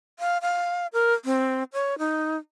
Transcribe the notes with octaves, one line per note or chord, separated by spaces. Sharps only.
F5
F5
A#4
C4
C#5
D#4